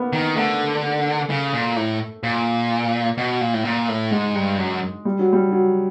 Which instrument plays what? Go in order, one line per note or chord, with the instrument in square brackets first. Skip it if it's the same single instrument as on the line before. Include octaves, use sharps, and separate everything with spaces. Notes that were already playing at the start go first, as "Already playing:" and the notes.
Already playing: [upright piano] A#3 B3
[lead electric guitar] D#3
[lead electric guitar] D3 [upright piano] A3
[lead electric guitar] C#3
A#2
A2
A#2
B2
A#2
A2
A#2
A2
[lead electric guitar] G#2 [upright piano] G#3
[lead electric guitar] G2
F#2
[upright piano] G3
F#3
G3
F#3